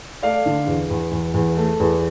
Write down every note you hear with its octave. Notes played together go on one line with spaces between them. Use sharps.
A3 D5 F5
D3
E2
E2
E2
E2
A3
E2